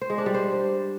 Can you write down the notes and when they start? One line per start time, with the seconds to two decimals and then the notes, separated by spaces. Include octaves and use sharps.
0.01 C5
0.10 G#3
0.18 D4
0.26 G3
0.34 C5